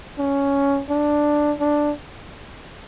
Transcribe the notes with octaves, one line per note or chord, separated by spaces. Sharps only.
C#4
D4
D4